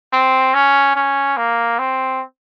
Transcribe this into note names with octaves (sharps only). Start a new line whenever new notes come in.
C4
C#4
C#4
A#3
C4